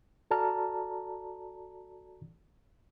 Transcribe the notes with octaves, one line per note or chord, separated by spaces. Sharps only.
F#4 A4 D5 A5 A#5 F6